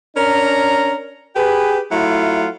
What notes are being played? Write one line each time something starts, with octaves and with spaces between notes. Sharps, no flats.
C#4 D4 A#4 A#5
G4 G#4 B4
F#3 A3 E4 F4